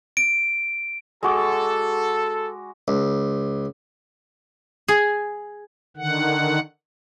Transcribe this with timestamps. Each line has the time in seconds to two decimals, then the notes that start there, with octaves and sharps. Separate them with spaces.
0.17 D7
1.23 G#3 F#4 A4 D6
2.88 C#2
4.88 G#4
5.97 D3 D#3 F#5